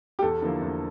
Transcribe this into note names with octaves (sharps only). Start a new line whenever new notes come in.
G4
E2 A4
D3 F3 A#3 E4
E2